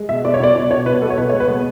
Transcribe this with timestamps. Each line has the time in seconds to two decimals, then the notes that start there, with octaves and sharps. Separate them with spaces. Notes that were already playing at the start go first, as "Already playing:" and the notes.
Already playing: G#3
0.09 B2 E5
0.25 B2 D5
0.34 C#5
0.40 B2 D5
0.56 B2
0.70 B2 C#5
0.86 B2 B4
1.02 B3 A4
1.10 C#5
1.18 B2 B4
1.29 G#3 C#5
1.40 B4
1.48 B3